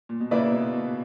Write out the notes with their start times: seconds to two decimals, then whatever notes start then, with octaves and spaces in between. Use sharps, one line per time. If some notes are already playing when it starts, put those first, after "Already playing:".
0.09 A#2
0.20 B2
0.31 A#2 C#3 A#3 E4 B4 D5
0.52 B2
0.73 B2